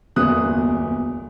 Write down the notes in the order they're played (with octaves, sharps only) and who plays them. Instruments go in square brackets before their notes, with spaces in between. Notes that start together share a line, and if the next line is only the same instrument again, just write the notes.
[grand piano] D1 G1 E2 A#3 D#6 F#6